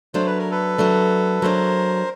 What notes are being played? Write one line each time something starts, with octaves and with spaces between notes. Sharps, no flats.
F#3 A3 D4 C5
B4
A#4
A4 B4
F#3 A3 D4
F#3 A3 D4 A#4 C5